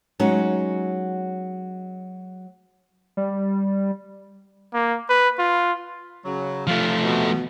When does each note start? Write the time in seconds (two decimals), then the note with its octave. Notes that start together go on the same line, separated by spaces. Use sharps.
0.20 F#3 G#3 C#4 D#4 F#4
3.17 G3
4.74 A#3
5.09 B4
5.39 F4
6.25 C#3 F#3
6.67 F3 A3 F4
7.04 B2